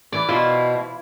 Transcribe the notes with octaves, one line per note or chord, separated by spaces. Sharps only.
E3 D5
B2 E4 F4 C5